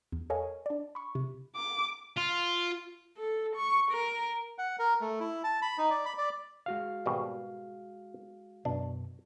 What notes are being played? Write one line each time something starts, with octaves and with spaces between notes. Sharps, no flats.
E2
A4 A#4 C#5 D#5 F5 G#5
D4 D5
B5 C#6
C3
D6
F4
A4
C#6
A#4
F#5
A#4
A3
E4
A5
B5
D#4
D5
B5
D5
G#3 F#4 F5
G#1 B2 G3
F#2 B2 D4